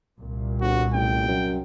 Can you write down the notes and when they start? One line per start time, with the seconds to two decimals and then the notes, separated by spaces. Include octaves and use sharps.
0.20 C2 A#2
0.61 G1 F#4
0.93 A1 G5
1.28 F#2